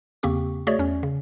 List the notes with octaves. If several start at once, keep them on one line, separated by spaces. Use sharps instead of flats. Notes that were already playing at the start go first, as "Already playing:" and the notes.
E2 C#3 A#3 C4 G4 C#6
A3 F#4 G#4 C#5 D5 E5
E2 C#4
C#3